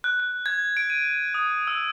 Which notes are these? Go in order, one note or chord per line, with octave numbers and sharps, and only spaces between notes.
F#6
F#6
G#6
D7
D#7
D#6
E6